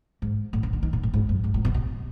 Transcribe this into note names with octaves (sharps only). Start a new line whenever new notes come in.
G#2
A2
C#3
D3
D#3
A#2
A2
G#2
F#2
G#2
A#2
B2
C3